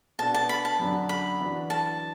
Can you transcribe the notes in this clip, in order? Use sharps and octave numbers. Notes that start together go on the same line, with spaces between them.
B2 B3 D4 A5
A5
B5
A5
F#2 D3 F#3 D4 F#4
B5
E3 D4 F#4
A5